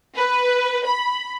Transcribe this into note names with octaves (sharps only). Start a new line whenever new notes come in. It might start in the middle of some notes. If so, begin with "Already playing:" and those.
B4
B5